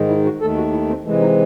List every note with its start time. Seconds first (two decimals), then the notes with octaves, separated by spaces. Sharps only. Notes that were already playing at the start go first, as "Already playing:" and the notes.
Already playing: G#2 D#3 G#3
0.09 E4
0.24 F#4
0.41 D#2 D#3 A3 A4
0.57 F#4
0.72 E4
0.89 C4
1.05 C3 E3 G#3 A3
1.21 D#4